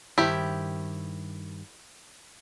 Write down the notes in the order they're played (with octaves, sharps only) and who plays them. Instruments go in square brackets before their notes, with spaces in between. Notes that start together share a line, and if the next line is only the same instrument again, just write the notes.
[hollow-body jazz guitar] G2 D#3 C5 [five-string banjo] E4 G4